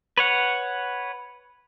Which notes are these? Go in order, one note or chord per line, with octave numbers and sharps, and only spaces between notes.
B4 C#5 F#5